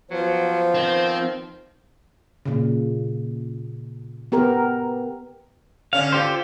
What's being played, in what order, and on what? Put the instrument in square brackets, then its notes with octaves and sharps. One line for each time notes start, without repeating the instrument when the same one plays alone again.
[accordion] F3 [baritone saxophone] F#3 [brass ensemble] B3 C5
[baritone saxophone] D#3 [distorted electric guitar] C4
[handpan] A#2 C#3
B3 G4 A#4
[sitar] D3 C#4 [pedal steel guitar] F5
[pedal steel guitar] F4 G4 C5